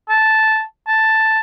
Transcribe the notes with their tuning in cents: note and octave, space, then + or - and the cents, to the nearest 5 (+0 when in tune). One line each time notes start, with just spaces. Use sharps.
A5 -5
A5 +5